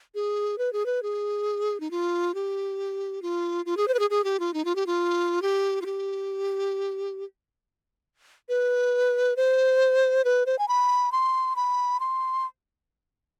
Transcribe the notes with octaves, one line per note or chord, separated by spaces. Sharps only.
G#4
B4
G#4
B4
G#4
D#4
F4
G4
F4
F4
G#4
C5
B4
G#4
G#4
G4
F4
D#4
F4
G4
F4
G4
F4
G4
B4
C5
B4
C5
G#5
B5
C6
B5
C6